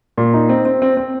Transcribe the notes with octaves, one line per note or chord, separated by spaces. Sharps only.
A#2
D#4
C4
C4
C4
C4